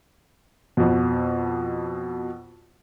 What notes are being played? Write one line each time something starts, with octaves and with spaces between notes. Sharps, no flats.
F2 B2